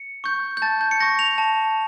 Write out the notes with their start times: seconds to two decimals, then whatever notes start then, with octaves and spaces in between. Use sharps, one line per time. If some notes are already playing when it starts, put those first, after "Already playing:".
Already playing: C#7
0.24 C#6 G6
0.57 G6
0.62 A5 A6
0.81 G6
0.91 C#7
1.00 C#6 G6 A#6
1.19 F7
1.38 A5